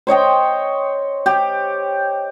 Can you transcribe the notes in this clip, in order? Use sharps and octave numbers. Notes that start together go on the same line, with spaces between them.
C5 C#5 D#5 G5
G4